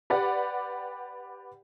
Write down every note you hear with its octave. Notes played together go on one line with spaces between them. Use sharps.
G4 B4 D5 F#5